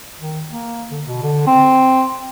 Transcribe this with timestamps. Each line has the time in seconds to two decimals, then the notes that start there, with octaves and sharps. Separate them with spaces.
0.20 D#3
0.51 A#3
0.91 D3
1.07 B2
1.23 D3
1.47 C4